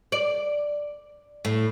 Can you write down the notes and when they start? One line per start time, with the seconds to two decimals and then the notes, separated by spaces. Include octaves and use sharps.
0.12 D5
1.45 A2